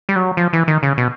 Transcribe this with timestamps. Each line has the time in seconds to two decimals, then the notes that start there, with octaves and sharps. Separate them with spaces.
0.09 G3
0.16 F#3
0.37 F3
0.53 E3
0.68 D#3
0.83 C#3
0.98 B2